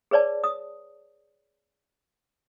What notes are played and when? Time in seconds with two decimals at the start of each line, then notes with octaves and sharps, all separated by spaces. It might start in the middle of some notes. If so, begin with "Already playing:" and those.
0.11 G#4 B4 C#5 D5 A5
0.44 D#6